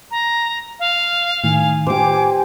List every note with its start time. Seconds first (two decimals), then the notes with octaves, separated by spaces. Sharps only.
0.11 A#5
0.79 F5
1.44 A2 D#3 G#5
1.87 A2 G4 C5 D6